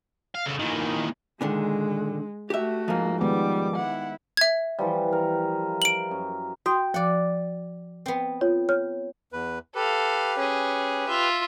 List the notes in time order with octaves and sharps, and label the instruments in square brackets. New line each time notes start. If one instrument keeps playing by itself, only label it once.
[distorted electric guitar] F5
C#3 A4
[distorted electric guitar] A#2 E3 [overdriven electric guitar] D#3
[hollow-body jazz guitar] A#2 D3 D#3 [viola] G#3
[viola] A3 F#4 [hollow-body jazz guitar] G4 E5
[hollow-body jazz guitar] G#2 F3 [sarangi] A#3
[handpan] D#3 G#3 B3 [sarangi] G3 [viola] D6
[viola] E4 [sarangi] F#5
[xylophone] E5 G#6
[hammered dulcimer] E3 F3 G3
A#4
[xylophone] D7 F#7
[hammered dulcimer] F#2
[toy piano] F#4 [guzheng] G5 [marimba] C6 D#6
[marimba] F3 [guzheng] D5 F#5
[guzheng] B3 C4
[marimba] F4 [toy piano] C#5
[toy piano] C#5 [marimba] F6
[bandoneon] E2 B4
[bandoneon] G4 B4 [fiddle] A4 F5
[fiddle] C#4 G#4
F4 E5